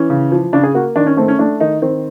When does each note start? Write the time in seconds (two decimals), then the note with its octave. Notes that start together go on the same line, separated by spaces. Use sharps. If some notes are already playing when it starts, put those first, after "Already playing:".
Already playing: E3 C#4
0.10 C#3
0.32 F3
0.53 C#3 D4
0.63 G#4
0.74 A#3 F#4
0.96 D#3 D4
1.06 C#4
1.17 A3 C4
1.28 C#4
1.39 A3 D4
1.60 D#3 D#4
1.82 D#3 C4